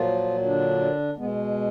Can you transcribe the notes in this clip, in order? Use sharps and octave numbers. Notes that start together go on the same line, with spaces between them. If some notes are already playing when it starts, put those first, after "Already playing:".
Already playing: A#2 F3 F#3 F4
D3 D4
B2 G#3 B3